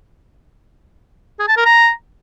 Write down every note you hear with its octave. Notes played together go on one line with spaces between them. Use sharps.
G#4
A5
A#4
A#5